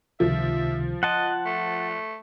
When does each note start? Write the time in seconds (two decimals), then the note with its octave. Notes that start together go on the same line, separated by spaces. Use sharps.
0.20 C#2 C3 D#3 F3 E5
1.03 D#5 F#5 A5 C6 F#6
1.46 A3